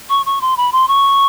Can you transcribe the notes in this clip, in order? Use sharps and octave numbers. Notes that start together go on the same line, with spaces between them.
C#6
C#6
C6
B5
C6
C#6